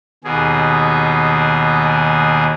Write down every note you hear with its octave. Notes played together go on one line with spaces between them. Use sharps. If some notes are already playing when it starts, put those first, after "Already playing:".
D#2 B2 G#4